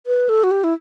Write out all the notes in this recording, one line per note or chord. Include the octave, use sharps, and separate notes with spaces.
B4
A4
F#4
G4
E4